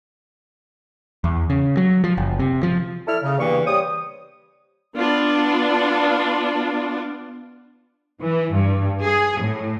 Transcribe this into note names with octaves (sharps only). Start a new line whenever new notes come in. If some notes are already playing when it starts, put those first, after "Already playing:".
E2
C#3
F#3
F3
F#1
C3
F3
E4 A4 D5 F6
C#3
E2 G2 C#3 E3 A#3 C#6
G3 C5 C#5 D#6
B3 D4 F4
E3
G2
G#4
A2